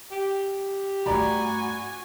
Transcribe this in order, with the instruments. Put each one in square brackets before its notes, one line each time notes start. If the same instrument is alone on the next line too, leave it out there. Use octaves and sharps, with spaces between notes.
[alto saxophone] G4
[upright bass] G2 A3 [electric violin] F#4 G#5 [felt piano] D5 A#5 B5